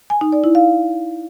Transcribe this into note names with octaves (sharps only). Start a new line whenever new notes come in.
G#5
D#4
D5
E4
F5